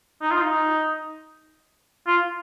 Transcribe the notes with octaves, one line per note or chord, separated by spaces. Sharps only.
D#4
F4
D#4
F4